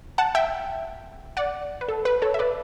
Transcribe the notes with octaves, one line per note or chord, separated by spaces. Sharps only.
F#5 A5
E5 G5
D5 F#5
B4
A4
B4
A4 C#5
E5
B4 D5